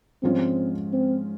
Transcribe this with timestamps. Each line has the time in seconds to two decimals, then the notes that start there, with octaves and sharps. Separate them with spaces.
0.23 G#2 F3 G#3 C4 C#4 F4
0.93 C4